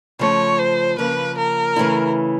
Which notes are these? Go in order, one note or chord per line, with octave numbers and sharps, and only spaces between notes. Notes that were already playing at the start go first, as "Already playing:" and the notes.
C#3 F3 A3 C#5
C5
C#3 F3 A#3 B4
A#4
C#3 E3 A3 C#4 E4